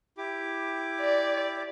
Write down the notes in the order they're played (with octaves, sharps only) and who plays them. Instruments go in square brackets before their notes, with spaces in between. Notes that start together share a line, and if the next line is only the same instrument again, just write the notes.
[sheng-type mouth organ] E4 G4 D6
[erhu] D5